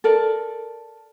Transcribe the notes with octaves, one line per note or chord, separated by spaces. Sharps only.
A4 A#4 D5